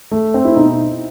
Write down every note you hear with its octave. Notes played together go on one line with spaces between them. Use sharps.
A3
C4
E4
B2 D#4